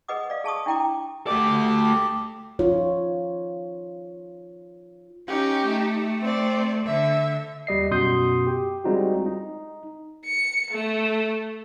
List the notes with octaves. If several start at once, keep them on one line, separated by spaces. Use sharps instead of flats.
G#4 B4 D#5 F#5 D6 D#6
D5 F5
G#4 A5 C#6 D#6
D4 E4 G5 A#5 D6
A3 G4 D5
D#4 F4 C#5
C#4 D#4 G4
A3
C4 D5
D3 E5
D#2 G3 D#5 C7
F#2 B2 C6 D#6 G6 C7
G4
G3 G#3 C4 D#4 F4 F#4
D#4
C#7
A3